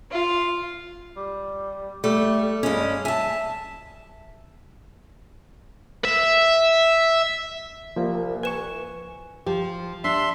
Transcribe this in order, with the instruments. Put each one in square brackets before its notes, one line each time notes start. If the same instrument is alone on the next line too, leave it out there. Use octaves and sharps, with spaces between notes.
[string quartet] F4
[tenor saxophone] G3
[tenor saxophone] G3 [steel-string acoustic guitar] A3
[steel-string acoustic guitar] G2 C#4 [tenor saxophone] G#3
[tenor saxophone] E5 [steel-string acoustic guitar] G#5 A5
[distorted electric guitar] E5
[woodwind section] C2 [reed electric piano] F3 A#3
[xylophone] B4 E7 [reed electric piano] G#5 C#6
[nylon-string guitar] F3 [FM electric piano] G4
[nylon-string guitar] D4 [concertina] E5 C6